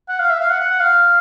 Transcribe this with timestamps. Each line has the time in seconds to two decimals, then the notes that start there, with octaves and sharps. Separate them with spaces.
0.09 F#5
0.19 F5
0.30 E5
0.39 F5
0.50 F#5
0.60 F#5
0.71 F#5
0.80 F5